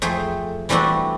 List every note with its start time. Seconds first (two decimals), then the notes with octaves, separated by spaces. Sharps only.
0.02 F2 A3 G#4 C5
0.69 E3 G3 A3 C4 D4 F#4